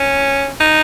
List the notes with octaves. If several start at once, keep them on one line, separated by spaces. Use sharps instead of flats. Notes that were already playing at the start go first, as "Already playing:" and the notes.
Already playing: C#4
D#4